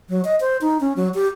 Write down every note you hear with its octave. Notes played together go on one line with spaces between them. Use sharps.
F#3
D#5
C5
D#4
C#4
F#3
G4